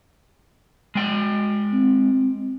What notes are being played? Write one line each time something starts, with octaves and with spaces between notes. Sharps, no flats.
G#3 G5
C4